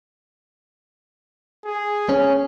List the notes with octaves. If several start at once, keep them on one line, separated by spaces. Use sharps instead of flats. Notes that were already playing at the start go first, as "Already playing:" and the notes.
G#4
C#4